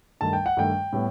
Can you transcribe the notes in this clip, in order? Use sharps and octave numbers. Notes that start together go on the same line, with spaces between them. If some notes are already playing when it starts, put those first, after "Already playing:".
G2 D#3 A3 A5
G5
F#5
G2 D#3 A3 G5
A2 G3 B3